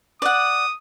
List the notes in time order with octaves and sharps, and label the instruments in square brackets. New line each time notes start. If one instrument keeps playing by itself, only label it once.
[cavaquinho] D5 F#5 [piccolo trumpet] D#6